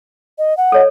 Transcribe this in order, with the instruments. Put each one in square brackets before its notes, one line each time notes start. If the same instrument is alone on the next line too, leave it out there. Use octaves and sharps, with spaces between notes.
[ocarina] D#5
F#5
[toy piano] A4 C#5 D#5